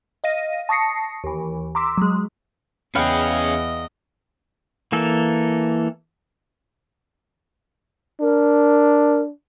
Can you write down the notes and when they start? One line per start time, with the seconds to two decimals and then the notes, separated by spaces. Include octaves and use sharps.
0.24 D#5 F5 A#6 D#7
0.69 A5 C#6 D#6 A#6 C7 C#7
1.24 D#2 E3
1.75 A#5 C6 D6 E6 B6
1.98 F#3 G#3
2.95 E2 C#4 G#4 B4 D#5 F5 G5
4.92 E3 A#3 A4
8.21 D4 A#4